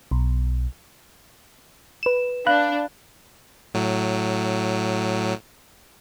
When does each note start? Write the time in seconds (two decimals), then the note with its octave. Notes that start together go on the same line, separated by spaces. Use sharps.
0.11 B1
2.03 B4 E7
2.47 D4 F5 B5 F#6
3.74 A2 F#3